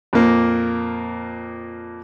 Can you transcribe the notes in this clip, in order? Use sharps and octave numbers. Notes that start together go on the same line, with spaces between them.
F2 A#2 A#3